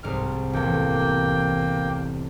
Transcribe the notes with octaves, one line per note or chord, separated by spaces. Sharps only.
C2 G#2 F6
A1 E2 A#3 G5